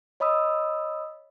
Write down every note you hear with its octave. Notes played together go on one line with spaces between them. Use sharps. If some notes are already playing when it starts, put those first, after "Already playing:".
C#5 D#5 B5 D#6 E6